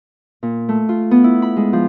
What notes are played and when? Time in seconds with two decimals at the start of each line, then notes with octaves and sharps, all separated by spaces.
0.43 A#2
0.69 A3
0.89 F4
1.11 B3
1.24 E4
1.42 B5
1.56 G#3
1.73 F3